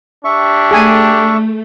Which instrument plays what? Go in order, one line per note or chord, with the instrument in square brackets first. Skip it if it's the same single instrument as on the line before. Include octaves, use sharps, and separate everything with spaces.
[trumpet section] D4 G4 [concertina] E5 C#6
[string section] A3 [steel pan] G#4 G#5